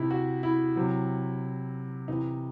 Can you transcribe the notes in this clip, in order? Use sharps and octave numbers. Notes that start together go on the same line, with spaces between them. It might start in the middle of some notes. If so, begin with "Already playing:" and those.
Already playing: C3 D#4 E4
F#4
E4
C3 F#3
C3 E3 D#4